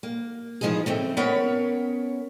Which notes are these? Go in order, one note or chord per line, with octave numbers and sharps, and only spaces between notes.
A#3
E3 F3 G#3 D#4 G#4
C#3 A3 C4
B3 C#4 A#4 B4 C#5